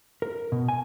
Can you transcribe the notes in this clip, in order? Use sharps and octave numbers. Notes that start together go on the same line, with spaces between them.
A#4
B2
G#5